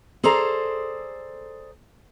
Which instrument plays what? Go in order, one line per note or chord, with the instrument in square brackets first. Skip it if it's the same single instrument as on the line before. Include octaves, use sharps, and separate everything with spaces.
[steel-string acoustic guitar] G#4 A4 C5 D5 A#5